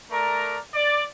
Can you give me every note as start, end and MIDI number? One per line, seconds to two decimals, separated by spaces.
0.11 0.59 57
0.11 0.59 70
0.11 0.59 74
0.11 0.59 82
0.74 1.04 74